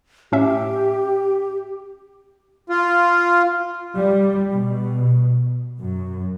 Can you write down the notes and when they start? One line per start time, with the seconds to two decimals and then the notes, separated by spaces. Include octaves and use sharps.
0.32 A2 C#4 G4 E5
2.69 F4
3.97 G3
4.53 B2
5.81 F#2